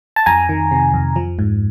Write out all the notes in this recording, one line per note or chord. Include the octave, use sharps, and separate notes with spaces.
A5
F2 G#5 A#5
D#3
C3
F2
F3
G#2